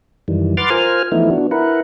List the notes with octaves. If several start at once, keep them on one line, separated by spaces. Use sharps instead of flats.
F#2 D#3 E3 G3
B4 F#5 C6 D6 F6 A6
F4 A#4 C5 G#5 F6
E3 F3 A3 B3 D#4 E4
B3 D4 F#4
E4 A#4 B4 F#5